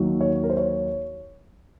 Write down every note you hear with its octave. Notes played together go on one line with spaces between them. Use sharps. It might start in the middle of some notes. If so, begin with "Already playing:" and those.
Already playing: D#2 D#3 F#3
C#5
A#4
C5
C#5